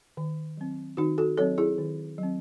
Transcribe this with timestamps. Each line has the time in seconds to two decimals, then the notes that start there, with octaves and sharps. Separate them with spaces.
0.17 D#3
0.57 F#3 C4
0.97 D#3 D#4 F#4
1.18 F#4 A4
1.38 F#3 C4 A4 C#5
1.58 E4 G#4
1.78 D#3
2.18 F#3 C4